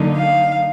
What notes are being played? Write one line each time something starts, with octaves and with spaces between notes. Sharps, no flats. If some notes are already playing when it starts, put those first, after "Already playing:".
Already playing: D3 F#3 A#3 D#4
F5